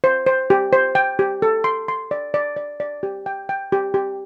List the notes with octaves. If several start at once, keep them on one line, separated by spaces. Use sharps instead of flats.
C5
C5
G4
C5
G5
G4
A4
C6
C6
D5
D5
D5
D5
G4
G5
G5
G4
G4